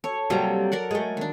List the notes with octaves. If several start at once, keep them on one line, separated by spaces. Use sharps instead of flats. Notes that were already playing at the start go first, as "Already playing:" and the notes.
A4 C#5
C3 F#3 G3 A#3 A#5
A#4 D5 F#5
G#3 A3
D#3 D4